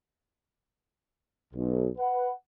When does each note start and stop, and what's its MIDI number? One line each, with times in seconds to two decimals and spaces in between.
1.54 1.87 35
1.98 2.30 71
1.98 2.30 78